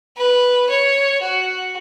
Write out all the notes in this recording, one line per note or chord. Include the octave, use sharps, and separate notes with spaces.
B4
C#5
F#4